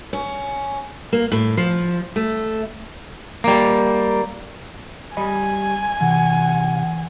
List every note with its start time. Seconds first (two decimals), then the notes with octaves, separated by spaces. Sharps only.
0.13 C#4
1.13 A#3
1.32 A2
1.57 F3
2.16 A3
3.44 G3 A#3
5.17 G3 D#5 G#5 B5
6.01 C3 E3 F#5